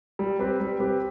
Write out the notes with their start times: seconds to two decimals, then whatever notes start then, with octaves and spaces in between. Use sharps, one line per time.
0.19 G3
0.39 C4 G4 B4
0.60 G3
0.79 C4 G4 B4